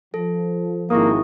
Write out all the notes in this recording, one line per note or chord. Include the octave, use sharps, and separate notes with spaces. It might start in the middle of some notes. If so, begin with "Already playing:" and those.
F3 A4
G#1 A#3 E4 C#6 D#6